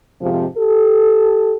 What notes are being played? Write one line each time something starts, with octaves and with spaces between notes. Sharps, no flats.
F2 G#2 C3 F3
G4 A4